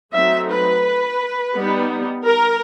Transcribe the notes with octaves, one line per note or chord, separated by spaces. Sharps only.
F#3 A3 C4 D#4 E5
B4
G3 B3 D#4
A#4